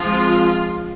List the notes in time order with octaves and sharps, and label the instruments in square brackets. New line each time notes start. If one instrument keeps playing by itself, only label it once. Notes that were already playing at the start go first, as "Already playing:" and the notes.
Already playing: [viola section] F3 G#3 C4 F4